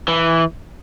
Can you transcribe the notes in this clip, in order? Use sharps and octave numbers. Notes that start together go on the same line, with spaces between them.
E3